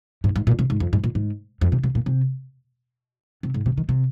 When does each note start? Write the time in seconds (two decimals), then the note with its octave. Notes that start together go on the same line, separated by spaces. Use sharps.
0.24 G#2
0.36 G#2
0.47 A#2
0.59 C3
0.70 G#2
0.80 F2
0.93 G#2
1.04 A#2
1.15 G#2
1.61 F2
1.72 C3
1.83 C3
1.95 A#2
2.06 C3
3.43 C3
3.54 G#2
3.66 C3
3.78 D#3
3.89 C3